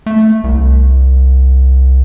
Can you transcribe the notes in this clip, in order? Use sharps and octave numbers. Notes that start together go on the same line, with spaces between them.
A3
C2